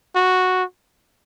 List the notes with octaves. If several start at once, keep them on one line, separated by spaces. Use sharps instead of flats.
F#4